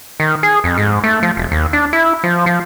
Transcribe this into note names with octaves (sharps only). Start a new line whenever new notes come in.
D#3
G#4
F2
G#2
A3
F3
E1
D#2
D4
E4
F3
F3